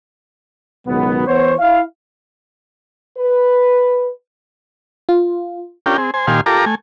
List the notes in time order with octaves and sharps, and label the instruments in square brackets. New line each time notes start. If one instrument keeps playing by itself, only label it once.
[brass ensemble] C#2 G#2 B2 D#3 F#3 B3
E3 B3 C5 C#5
E4 F5
[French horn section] B4
[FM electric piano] F4
[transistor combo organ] C#4 D4 F4 G4 A#4 G5
C4 G#4
C5 G#5
A#2 D#3 G4 F5 G#5 C6
F4 G4 A4 A#4 A#5 D6
A3 G#5